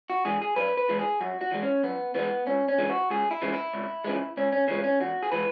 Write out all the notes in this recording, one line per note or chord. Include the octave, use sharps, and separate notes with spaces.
F#4
E3 G#3 G#4
G#4
F#2 B4
B4
E3 G#3
G#4
F#2 F#4
F#4
E3 G#3
C#4
F#2 B3
E3 G#3 B3
C#2 C#4
C#4
C#3 E3 G#3
F#4
C#2 G#4
E4
C#3 E3 G#3
E4
C#2
C#3 E3 G#3
C#2 C#4
C#4
C#3 E3 G#3 C#4
C#4
E2 F#4
G#4
E3 G#3 B4